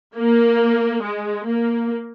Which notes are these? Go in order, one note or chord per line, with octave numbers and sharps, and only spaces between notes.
A#3
G#3
A#3